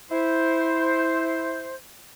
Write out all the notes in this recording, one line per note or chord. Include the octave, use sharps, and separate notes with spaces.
E4 C5